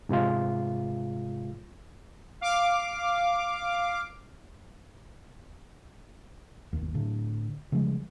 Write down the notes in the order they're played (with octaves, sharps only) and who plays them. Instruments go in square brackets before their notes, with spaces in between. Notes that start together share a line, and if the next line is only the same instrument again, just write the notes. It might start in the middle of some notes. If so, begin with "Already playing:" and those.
[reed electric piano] G#2 C3 G#3 F4
[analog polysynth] F5 D6
[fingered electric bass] G1 D#2
A2 D3
C#3 F3 G3 G#3